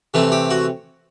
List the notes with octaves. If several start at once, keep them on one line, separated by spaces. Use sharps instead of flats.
C3 E3 A3 C4
G4
F#4